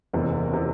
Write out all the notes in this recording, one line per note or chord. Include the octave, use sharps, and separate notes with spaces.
F#1 E2 C3
C3